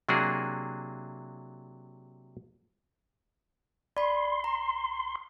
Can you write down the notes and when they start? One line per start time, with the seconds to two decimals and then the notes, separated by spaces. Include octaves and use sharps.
0.09 C3 F#3 A#3 D4 F#4 G#4
3.97 D5 B5 C6
4.44 A#5